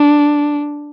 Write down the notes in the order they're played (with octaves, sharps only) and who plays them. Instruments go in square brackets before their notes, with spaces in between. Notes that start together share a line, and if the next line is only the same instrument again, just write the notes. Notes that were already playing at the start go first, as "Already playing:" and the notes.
Already playing: [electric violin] D4